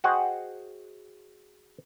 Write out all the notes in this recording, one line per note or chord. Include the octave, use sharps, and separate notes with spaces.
F#4 G#4 C5 D#5 F#5 G5